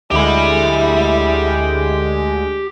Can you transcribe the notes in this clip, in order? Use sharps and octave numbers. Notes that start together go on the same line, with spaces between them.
D2 D3 G#3 E4 G4 B5